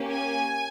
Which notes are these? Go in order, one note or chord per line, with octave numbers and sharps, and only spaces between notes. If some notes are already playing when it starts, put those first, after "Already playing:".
Already playing: A#3 C#4 G4
G#5